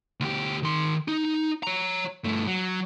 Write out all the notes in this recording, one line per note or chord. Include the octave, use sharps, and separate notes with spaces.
D2 G4
D#3 C6
D#4
C#5 A#5
G2 A3
F#3